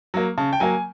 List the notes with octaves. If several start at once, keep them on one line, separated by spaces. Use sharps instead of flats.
F#3 A#3
C#3 A5
G5
F#3 A#3 G#5